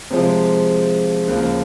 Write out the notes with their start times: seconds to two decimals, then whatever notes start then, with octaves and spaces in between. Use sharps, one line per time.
0.10 C3 F3 G#3
1.28 D#2 C#3 F3